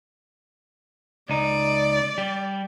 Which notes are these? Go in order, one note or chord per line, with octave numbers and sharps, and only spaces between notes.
C#2 D#4 D5
G3